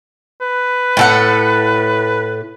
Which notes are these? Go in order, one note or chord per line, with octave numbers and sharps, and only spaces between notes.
B4
A2 A4 F#5